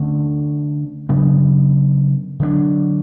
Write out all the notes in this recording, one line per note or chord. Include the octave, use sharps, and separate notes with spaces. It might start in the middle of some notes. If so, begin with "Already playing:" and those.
Already playing: D3 A3 C#4
C#3 F#3 B3 D4
D3 F#3 B3 D4